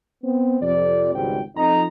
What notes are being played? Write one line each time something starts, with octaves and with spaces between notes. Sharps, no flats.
B3 C4
F2 C3 D5
G#1 C#2 G#2 G3 F#4 G5
F2 D#4 A#5